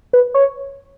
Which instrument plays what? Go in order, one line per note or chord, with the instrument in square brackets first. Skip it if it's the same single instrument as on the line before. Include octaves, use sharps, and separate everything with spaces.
[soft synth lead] B4
C#5